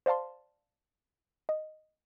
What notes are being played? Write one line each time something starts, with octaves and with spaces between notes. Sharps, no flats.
C5 D5 F5 A5 C6
D#5